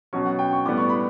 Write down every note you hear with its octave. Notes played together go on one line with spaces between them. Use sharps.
B2 F#3 C#4 C#6
F#5
G5
C#6
A2 G3 B3 D6
C#6
B5